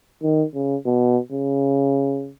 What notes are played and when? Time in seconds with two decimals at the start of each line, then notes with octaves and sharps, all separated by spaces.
0.23 D#3
0.54 C#3
0.86 B2
1.32 C#3